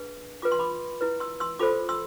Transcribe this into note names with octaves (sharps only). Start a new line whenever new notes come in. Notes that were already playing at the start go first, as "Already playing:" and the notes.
Already playing: D4 G#4 B4
F4 B4 D6
C6
B5 D6
E4 B4
C6 E6
C6 E6
F4 A4 C5 B5 D6
C6 E6